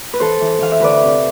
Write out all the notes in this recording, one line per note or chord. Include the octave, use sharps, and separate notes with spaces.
B4
E3 A4 C5
E3
E3 F5
E5
D2 B4 D5
C3